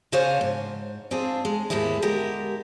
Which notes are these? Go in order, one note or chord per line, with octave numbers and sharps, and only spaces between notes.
C#3 D4 C5 C#5 F5 G#5
G#2
C4 D4 F4 G#4
G#3
D#2 G#2 G3 G#3 E4
D3 G#3 G4 A#4